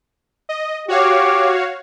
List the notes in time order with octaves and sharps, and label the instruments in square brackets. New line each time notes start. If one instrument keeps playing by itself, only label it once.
[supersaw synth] D#5
[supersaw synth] F#4 C#5 F5 [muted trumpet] G4